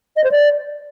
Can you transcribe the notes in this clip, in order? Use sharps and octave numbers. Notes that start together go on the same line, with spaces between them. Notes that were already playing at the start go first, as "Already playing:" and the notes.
D#5
C5
D5